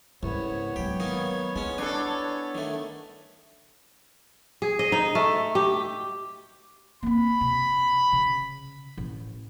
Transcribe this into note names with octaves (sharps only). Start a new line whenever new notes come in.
C2 G#2 C#3 B3 C#5
F#3 G#3 G4
D#3 A#3 D#4
G#3 C#4 E4
D4 A4 G#5
D#3 A3
G#4
D#5
D#4
A3
G4
A#3 C4 B5
C3
C#3
A1